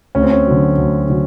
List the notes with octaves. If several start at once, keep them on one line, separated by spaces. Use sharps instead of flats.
D2 C#4
C4
C#4
D3 F#3
D2
D3 F#3